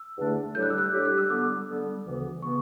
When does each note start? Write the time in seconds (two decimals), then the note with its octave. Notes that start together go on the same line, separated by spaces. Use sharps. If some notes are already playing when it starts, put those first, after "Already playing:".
Already playing: E6
0.17 E2 D3 A3 D4
0.55 A2 G3 D4 G4 G6
0.63 F#6
0.70 E6
0.78 F#6
0.92 A2 G3 D4 G4
1.05 F#6
1.18 E6
1.30 D3 G3 B3 D6
1.68 D3 G3 B3
2.05 D2 C#3 E3 B3
2.42 C#3 E3 B3 C#6